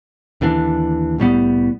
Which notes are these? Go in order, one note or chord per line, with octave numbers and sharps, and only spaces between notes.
D#2 D3 E3 D4
C2 A2 G3 B3